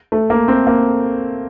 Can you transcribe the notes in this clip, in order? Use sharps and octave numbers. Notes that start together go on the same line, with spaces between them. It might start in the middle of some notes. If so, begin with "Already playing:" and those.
A3
A#3
C4
A#3